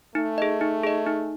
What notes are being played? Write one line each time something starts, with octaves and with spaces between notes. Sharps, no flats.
A3 D#4
G#4 D#5
D#4
G#4 D#5
D#4